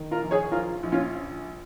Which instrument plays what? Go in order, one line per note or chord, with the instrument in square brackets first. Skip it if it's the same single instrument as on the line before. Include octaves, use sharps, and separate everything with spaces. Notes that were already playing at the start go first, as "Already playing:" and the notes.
Already playing: [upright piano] D#3
F4 A#4
A#1
G#4 C#5
F3 F4 A#4
A#1
C#4 F4